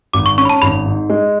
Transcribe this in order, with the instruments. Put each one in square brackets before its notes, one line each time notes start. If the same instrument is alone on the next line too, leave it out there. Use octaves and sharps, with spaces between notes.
[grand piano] G#1 [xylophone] D6
[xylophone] C#6
[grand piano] C#4 [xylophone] C#6
[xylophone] B5
A5
[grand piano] G#1 [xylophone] B5
[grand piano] G#2
G#3